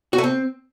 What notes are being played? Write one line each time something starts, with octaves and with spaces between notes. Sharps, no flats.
F#4
A3
C4